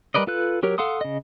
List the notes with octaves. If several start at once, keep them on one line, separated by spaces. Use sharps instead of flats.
G3 A#4 B4 D5 D#5
F4 A4 B4 F#6
F#3 G4 A#4 C#5
A4 F5 F#5 C6 D#6
C#3 D#5